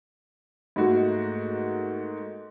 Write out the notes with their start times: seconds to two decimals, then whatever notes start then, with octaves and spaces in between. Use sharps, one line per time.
0.76 G#2 A3 A#3 F#4